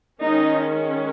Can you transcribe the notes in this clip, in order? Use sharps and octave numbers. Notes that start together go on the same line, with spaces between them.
D#3 G#3 C#4 D#4